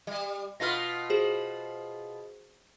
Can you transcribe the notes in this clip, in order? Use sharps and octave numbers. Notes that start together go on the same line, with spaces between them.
G3
B2 F4 B4 F6 A#6
F#4 G#4 C5